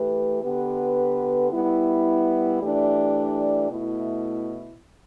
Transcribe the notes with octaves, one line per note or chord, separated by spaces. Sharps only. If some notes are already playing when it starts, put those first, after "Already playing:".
Already playing: E3 A3 G4 B4
D3 B3 G4 B4
G3 B3 E4
E3 A3 D4 G4 D5
B2 A3 E4